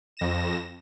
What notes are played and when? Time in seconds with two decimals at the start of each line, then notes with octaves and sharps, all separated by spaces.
0.17 F2 A#6 E7